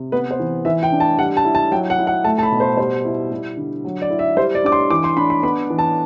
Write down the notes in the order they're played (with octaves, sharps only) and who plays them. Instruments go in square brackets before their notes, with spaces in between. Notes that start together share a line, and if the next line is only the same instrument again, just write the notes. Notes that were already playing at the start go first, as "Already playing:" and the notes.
Already playing: [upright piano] C3
B3 B4
C5
E3
E3 E5
G5
D4
A5
G3 F#5
A5
E4
A5
F#3 G5
F#5
E4
F#5
A3 A5
A5
B5
B2
C5
G3 C5
E4
G3
D3
F#3
D5
E4
E5
G3 C5
D5
D4 D6
C6
E3 D6
C6
D4 B5
B5
B3 B5
E3
A5